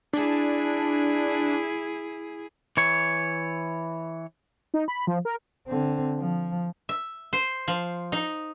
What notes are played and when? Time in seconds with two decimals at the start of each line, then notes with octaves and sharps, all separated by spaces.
0.13 D4 E4 G#4
2.77 E3 C#5
4.74 D#4
4.88 B5
5.07 F3
5.25 A#4
5.67 D3 C4
6.19 F3
6.89 E5
7.33 C5
7.68 F3
8.12 D#4